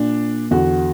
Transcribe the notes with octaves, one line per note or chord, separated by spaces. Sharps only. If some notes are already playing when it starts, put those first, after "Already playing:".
Already playing: A#2 D4
E2 D3 F#4